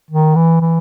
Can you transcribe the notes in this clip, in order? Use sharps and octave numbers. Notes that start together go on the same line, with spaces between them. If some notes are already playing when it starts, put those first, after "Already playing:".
D#3
E3
E3